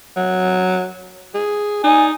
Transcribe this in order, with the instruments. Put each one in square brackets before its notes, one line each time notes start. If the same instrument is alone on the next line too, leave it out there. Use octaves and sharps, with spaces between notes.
[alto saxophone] F#3
G#4
[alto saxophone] D#4 [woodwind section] D5 G#5